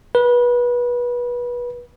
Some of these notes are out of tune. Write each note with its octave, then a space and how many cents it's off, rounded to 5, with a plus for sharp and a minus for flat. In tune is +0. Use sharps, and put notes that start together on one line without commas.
B4 -25